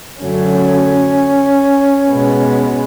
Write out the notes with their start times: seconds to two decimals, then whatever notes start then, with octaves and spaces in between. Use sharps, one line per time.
0.22 F#2 D3 F#3 A3 C#4
2.11 B2 G#3 B3